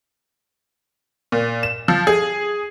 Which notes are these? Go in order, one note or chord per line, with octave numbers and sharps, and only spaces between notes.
A#2
E7
F3
G#4